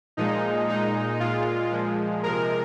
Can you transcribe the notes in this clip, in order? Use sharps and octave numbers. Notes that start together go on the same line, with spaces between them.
A#2 F3 G#3 D#4
A#2 G#3 D#4
A#2 G#3 F4
A#2 F3 G#3
C3 F3 G#3 A#4